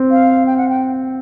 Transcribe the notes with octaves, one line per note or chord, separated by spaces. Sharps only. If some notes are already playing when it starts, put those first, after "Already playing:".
Already playing: C4
F5
G5
F#5
G5